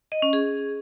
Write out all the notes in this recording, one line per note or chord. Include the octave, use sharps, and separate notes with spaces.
D#5
C#4
G#4